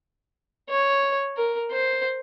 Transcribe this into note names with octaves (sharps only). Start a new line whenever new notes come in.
C#5
A#4
C5